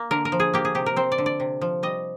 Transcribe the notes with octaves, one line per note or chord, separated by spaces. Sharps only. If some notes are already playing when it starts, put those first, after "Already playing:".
Already playing: A#3
D3 A#4
A#4
F3
G#4
A#3 G4
G#4
C3 G4
A#4
C4 C5
D5
D3
D5
C3
F3
G3 D#5